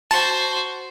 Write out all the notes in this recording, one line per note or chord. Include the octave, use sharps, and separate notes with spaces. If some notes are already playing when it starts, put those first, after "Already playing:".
F#4 C5 A5